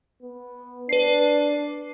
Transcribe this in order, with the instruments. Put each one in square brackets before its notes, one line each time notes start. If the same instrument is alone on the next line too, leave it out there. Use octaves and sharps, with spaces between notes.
[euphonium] B3
[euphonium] D4 [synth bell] B4 C7